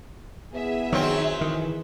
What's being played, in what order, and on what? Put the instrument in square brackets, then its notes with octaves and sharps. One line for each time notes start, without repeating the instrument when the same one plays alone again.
[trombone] B3 [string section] E4 G#4 E5
[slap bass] D#3 [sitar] F#3 C4
[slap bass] D#3 [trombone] E3